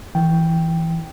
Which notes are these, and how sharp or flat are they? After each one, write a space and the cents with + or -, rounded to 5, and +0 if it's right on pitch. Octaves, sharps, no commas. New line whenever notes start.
E3 +0 G5 +0